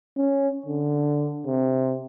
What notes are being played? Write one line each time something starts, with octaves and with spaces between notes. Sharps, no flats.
C#4
D3
C3